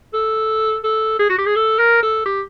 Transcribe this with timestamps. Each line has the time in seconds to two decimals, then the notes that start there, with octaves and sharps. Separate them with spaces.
0.14 A4
0.84 A4
1.19 G#4
1.29 F#4
1.38 G4
1.46 G#4
1.56 A4
1.79 A#4
2.02 A4
2.26 G4